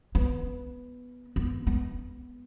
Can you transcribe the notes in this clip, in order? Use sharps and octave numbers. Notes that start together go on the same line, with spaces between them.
B3
B3
B3